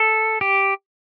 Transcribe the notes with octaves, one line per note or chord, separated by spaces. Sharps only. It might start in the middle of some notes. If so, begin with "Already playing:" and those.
Already playing: A4
G4